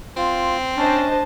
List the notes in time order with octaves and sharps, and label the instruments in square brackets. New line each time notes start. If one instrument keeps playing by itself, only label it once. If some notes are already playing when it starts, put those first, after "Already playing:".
[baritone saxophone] C4 [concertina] F4
[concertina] C#4 [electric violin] D4 A5 [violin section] C5 D#5